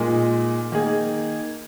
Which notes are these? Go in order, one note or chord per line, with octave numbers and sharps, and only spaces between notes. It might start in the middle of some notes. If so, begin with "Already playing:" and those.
Already playing: A#2 G#3 D#4
D#3 A#3 D#4 G#4